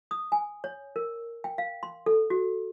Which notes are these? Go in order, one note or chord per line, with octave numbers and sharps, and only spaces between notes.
D#6
G#5
C#5
A#4
G5
F5
C6
A4
F#4